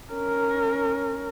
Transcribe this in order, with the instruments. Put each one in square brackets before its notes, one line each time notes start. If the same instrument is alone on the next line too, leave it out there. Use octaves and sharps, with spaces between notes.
[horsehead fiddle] C#4 A#4